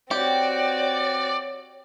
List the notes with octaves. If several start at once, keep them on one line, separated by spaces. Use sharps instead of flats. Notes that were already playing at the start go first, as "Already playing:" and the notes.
C4 F#4 G4 C#5 D5